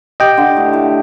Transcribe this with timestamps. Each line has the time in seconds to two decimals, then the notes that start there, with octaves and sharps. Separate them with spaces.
0.20 G4 D#5 G5
0.37 D3
0.57 A2
0.73 A2